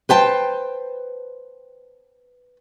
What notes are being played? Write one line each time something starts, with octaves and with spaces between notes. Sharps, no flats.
B4 C5 G5 A5